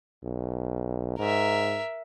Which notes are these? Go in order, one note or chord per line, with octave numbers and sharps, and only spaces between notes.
B1
G#2 A#4 E5